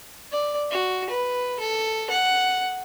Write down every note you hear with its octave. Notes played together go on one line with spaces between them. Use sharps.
D5
F#4
B4
A4
F#5